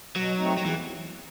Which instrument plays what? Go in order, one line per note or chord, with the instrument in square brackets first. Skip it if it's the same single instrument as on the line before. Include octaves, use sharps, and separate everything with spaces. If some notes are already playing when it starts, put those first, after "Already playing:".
[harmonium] B2 [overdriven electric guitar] F#3
[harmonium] A3 C4 D#4
[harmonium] E2 [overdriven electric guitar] F#3
[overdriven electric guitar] E3